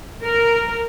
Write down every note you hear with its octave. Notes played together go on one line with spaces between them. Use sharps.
A#4